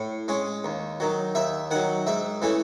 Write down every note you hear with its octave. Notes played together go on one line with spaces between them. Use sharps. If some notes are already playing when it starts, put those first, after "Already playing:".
Already playing: A2
G#3 C#4
D#2
D#3 F#3
D#2 E5
D#3 F#3 F#5
G#2 E5
E3 A3 C#4